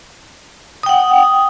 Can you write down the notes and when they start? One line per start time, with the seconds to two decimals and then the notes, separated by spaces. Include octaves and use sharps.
0.83 D#6
0.86 G5
0.89 F#5